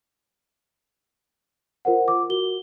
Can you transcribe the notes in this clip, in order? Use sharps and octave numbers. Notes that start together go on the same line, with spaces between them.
F4 A#4 C5 F#5
D6
F#4 A#4 G7